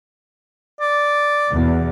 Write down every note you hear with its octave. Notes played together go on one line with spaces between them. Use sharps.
D5
E2 B2